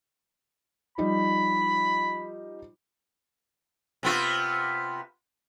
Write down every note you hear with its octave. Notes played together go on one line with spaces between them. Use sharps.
F3 G3 D#4 B5
C3 B3 F4